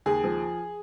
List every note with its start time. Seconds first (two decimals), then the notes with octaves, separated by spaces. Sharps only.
0.06 D#2 G#4
0.24 F3